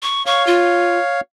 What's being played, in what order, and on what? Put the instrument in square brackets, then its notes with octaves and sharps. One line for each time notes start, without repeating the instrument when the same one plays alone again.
[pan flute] C#6
[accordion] C#5 F5 [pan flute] C#6
[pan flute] F4